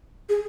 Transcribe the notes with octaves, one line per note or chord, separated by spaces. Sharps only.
G#4